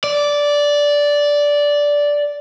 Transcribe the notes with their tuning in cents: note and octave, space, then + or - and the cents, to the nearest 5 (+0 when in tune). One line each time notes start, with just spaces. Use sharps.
D5 -10